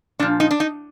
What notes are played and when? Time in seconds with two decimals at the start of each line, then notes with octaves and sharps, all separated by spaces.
0.19 A#2 F3 D4
0.40 D#4
0.51 D4
0.60 D#4